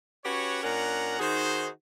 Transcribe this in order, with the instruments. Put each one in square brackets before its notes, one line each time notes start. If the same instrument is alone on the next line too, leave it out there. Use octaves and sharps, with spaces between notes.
[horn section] C#4 F#4 G4 B4 C#5
A#2 C#4 D4 A#4 F#5 A#5
D#3 D#4 F#4 G#4 C5